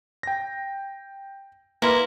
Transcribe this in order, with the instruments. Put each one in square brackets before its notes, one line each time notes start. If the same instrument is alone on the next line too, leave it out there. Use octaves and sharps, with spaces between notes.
[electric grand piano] G5 A#6
[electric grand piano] A#3 [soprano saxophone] E4 [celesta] B4 C6 F6 [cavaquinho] A#5